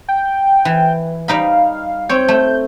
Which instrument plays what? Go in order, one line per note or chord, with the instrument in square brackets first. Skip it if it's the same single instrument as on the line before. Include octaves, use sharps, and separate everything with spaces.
[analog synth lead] G5
[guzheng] E3
[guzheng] G3 D#4 B5 [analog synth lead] F5
[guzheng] C4 C#5 [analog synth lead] G6
[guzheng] A3